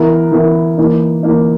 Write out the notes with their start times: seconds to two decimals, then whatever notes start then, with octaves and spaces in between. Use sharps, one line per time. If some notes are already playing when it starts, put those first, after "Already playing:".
Already playing: E3 B3 E4 A#4
0.32 E3 B3 E4 A#4
0.78 E3 A#3 D#4
1.23 E3 A#3 D#4